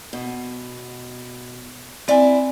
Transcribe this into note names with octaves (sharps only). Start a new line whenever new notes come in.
B2
C4 E4 D5 E5 G#5